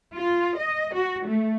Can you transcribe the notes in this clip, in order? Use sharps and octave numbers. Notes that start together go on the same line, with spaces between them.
F4
D#5
F#4
A3